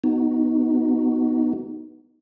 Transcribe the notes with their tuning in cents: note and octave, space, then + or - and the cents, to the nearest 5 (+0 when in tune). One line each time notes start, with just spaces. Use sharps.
B3 +0 D#4 +0 F#4 +20